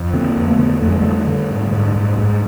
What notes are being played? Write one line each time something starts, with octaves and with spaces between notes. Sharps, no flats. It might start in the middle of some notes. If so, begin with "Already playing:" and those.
Already playing: F2
D3 A#3 C4
F2
A3 B3
D3
F2 A3
G#3
D3 G3 A3
D3
G#2
G#2
G#2
G#2